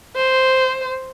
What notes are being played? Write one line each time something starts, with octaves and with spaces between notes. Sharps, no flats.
C5